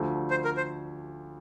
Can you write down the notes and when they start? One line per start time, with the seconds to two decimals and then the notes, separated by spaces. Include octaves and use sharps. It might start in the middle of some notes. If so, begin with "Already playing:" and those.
Already playing: D2 D3 F3 A3
0.30 C5
0.45 A#4
0.57 C5